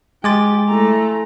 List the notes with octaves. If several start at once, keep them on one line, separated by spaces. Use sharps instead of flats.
G#3 G4 G5 G#5 C6 D6 A6
A3 E4 A#5